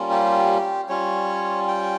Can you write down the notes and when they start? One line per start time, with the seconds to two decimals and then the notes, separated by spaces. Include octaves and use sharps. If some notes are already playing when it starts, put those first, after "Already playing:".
Already playing: G3 A#3 C#4 F4
0.11 G4
0.89 G3 C#4 F4 C#5
1.68 G5